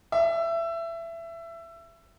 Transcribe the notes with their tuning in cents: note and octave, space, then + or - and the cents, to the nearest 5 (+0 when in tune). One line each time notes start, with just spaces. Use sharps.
E5 +20